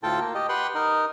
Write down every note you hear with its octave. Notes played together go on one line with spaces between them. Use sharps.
D2 A2 F4 A4 G5 A5
A#3
G4 D#5
G4 B4 F#5 G5 C6
D#4 A#4 D#5